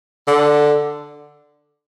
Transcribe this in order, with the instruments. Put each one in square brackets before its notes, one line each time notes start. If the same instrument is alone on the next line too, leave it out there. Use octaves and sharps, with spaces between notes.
[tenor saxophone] D3